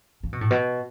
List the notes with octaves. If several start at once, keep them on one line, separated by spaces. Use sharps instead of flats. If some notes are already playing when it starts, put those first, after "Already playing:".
C#3
B2
A2
B2